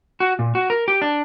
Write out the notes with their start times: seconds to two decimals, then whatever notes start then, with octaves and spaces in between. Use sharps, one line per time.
0.20 F#4
0.39 A#2
0.55 F#4
0.70 A#4
0.88 G4
1.02 D4